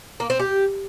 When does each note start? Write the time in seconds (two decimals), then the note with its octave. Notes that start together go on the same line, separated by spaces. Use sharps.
0.20 A#3
0.30 C4
0.40 G4